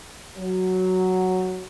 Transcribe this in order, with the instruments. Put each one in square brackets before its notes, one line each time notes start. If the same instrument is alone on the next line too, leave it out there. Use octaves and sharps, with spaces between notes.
[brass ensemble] F#3